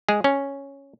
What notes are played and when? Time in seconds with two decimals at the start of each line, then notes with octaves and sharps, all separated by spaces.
0.09 G#3 G#4
0.24 C#4